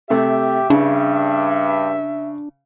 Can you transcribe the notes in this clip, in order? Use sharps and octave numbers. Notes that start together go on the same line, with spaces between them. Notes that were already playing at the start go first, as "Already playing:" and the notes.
C3 A3 G4 E5
G2 C#3 D4